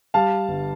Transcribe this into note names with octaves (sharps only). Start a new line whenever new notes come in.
G3 F5 A5
G1